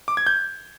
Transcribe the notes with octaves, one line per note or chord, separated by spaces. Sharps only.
D6
G#6
G6